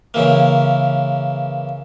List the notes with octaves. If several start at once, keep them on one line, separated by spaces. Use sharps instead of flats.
C#3 E3 A#3